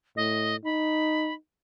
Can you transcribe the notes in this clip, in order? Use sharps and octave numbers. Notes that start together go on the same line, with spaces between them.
A2 D#5
D#4 B5